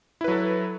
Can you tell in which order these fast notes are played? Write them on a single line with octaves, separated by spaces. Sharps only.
E4 B4 F#3 A4